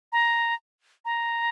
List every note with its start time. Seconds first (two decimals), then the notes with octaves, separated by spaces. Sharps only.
0.12 A#5
1.05 A#5